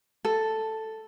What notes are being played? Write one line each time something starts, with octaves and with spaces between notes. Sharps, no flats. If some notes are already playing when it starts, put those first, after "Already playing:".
A4